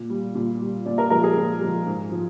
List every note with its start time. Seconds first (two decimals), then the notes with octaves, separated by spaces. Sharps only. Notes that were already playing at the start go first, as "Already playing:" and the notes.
Already playing: A#2
0.10 G3
0.35 A#2
0.61 G3
0.86 A#2 D5
0.98 A#4
1.10 F3 G#3 A#4
1.24 G#4
1.36 A#2
1.61 F3 G#3
1.86 G#2
2.12 F3